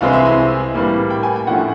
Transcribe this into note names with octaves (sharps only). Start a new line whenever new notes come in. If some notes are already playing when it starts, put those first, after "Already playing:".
C2 C3 E3 G#3 C4 F5
E5
G#5
A2 E3 G3 A#3
G5
G#5
G5
A2 F3 A3 C#4 F#5